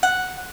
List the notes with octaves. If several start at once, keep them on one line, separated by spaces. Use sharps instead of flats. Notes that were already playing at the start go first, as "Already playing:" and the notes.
F#5